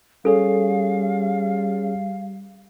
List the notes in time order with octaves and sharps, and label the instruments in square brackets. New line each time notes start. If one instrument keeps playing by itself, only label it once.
[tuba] G3 [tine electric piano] C#4 G#4 C#5 [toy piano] A4 [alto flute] F5